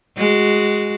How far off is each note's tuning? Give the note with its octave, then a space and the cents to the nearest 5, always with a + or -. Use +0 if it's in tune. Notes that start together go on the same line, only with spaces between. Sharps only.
G#3 +0 F#4 +0